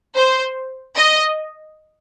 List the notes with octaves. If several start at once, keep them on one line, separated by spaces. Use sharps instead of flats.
C5
D#5